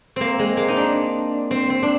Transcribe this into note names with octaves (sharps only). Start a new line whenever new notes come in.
A#3 C4
G#3
A#3
D#4
D4
C4
C4
D4